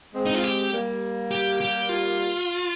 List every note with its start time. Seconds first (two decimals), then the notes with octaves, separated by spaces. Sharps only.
0.14 G#3 C4
0.26 D#4
0.34 F4
0.44 G4
0.72 G3 A#3
1.31 G4
1.61 G4
1.89 F4